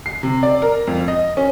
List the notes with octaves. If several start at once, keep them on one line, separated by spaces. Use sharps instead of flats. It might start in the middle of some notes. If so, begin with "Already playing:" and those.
C7
C3
D5
A#4
F2
D#5
C#4